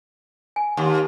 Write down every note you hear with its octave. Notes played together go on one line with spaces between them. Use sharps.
G#5
D#2 F#5 C6